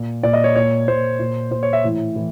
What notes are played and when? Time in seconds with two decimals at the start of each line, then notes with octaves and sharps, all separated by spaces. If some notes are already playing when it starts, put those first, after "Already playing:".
Already playing: A#2
0.23 A#2 D5
0.33 D#5
0.44 C#5
0.56 A#2 C#5
0.87 A#2 C5
1.19 A#2
1.51 A#2 C5
1.63 C#5
1.73 E5
1.84 A2 E3
2.15 A2 E3